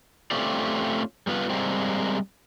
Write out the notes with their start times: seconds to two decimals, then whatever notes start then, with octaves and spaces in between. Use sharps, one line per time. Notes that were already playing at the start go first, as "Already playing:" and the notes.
0.31 A3 C4 C#4 F4 G4 D5
1.27 G3 B3 F4 B4
1.50 G3 G#3 A#3 C4